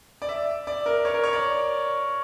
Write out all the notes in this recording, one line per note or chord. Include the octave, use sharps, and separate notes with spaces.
D5
E5
D5
A#4
C#5
A#4
C#5
D5